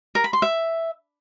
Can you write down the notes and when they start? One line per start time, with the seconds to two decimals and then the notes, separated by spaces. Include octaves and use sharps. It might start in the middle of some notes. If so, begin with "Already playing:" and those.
0.15 A#4
0.24 B5
0.33 C6
0.42 E5